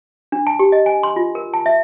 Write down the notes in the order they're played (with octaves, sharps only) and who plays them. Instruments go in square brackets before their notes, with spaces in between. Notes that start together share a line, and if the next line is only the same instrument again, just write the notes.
[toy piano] D4
A5
G4
D#5
G#5
C6
F4
A#4
A5
E5